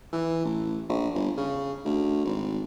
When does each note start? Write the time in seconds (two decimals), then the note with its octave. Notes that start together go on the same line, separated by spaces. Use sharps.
0.13 E3
0.45 A1
0.89 A#1
1.14 G1
1.37 C#3
1.85 D2
2.25 G#1